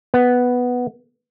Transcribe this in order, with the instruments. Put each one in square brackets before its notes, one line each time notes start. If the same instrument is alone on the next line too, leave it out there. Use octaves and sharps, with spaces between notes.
[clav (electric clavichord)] B3